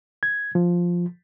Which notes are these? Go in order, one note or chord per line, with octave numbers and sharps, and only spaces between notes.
G#6
F3